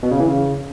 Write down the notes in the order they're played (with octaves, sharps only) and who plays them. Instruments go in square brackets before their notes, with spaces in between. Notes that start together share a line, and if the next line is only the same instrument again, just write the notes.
[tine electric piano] B2
C#3
E3
C#3